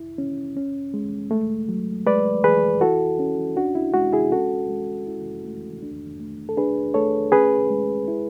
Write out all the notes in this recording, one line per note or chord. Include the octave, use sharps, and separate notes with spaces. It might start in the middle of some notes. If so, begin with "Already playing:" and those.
Already playing: E4
C#4
C#4
G#3
A3
F#3
G#3 B4 D5
E3 G#4 B4
E4 F#4 A4
C#4
D4 F#4
E4
G#3 F#4
E4 G#4
C#4 F#4 A4
G#3
E4
A3
D4
A3
A4
D4 G#4 B4
A3 A4 C#5
C#4 G#4 B4
G#3
E4